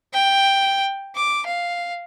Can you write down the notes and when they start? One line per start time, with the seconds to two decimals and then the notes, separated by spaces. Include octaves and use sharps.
0.13 G5
1.15 D6
1.47 F5